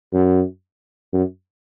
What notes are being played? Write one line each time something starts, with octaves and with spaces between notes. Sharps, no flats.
F#2
F#2